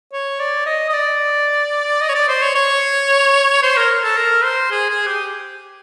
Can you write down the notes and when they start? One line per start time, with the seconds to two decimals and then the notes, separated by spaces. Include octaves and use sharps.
0.13 C#5
0.40 D5
0.66 D#5
0.89 D#5
0.94 D5
2.01 D#5
2.09 C#5
2.15 D5
2.28 C5
2.42 C#5
2.55 C#5
3.63 C5
3.77 A#4
4.03 A4
4.17 A#4
4.44 C5
4.71 G#4
4.89 G#4
5.07 G4